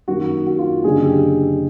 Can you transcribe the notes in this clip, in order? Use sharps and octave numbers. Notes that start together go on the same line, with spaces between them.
F#2 D#3 F#3 A#3 F#4
F#4
F4
F#1 F#2 D3 G#4
G4